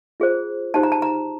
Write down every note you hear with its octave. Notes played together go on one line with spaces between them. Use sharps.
F4 G#4 C5
D#4 G4 C5 A5
A#5
A5
A#5